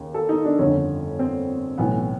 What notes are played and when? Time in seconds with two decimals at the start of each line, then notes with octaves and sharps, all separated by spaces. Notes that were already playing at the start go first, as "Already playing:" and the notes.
Already playing: D#2 C#3
0.14 A4
0.29 D#4
0.45 D4
0.59 G1 F2 D3 C#4
1.19 C4
1.78 B1 A2 E3 B3